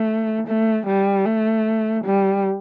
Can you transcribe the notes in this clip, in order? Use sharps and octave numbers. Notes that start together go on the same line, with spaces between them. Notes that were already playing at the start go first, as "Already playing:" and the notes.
Already playing: A3
A3
G3
A3
G3